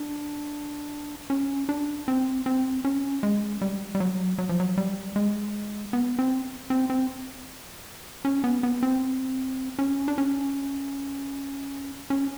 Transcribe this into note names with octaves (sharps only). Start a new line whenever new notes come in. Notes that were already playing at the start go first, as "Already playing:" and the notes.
Already playing: D4
C#4
D4
C4
C4
C#4
G#3
G3
G3
F#3
F#3
F3
F#3
G3
G#3
B3
C4
C4
C4
C#4
B3
B3
C4
C#4
D4
C#4
C#4